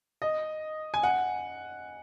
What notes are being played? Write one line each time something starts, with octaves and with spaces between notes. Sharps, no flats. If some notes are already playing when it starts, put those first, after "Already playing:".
D#5
G#5
F#5